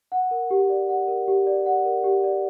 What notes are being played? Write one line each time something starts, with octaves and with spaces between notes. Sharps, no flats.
F#5
A#4
G4
D5
F#5
A#4
G4
D5
F#5
A#4
G4
D5